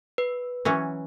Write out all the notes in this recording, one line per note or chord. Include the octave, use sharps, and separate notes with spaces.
B4
E3 F#3 C#4